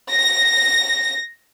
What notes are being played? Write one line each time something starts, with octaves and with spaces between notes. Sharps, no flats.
A#6